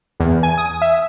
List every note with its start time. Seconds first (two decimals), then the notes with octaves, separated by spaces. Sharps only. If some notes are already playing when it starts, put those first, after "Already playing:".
0.20 E2
0.43 G#5
0.58 D#6
0.82 E5